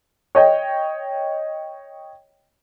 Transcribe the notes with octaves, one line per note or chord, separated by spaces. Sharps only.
C#5 D#5 G5